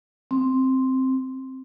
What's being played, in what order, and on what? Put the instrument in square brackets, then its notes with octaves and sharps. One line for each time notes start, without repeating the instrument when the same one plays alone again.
[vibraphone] C4